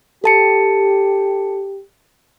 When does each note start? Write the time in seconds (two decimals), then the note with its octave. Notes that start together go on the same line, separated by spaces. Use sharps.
0.24 G4 A4 A5 C#7